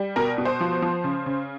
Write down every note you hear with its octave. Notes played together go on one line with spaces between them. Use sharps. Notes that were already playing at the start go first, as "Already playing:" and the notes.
Already playing: G3
B2 A#4
B2
C5
F3
F3
C#3
C#3